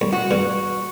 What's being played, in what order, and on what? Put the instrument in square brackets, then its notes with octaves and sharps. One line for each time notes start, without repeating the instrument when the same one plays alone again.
[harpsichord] C2
[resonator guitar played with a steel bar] F#4
[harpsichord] G2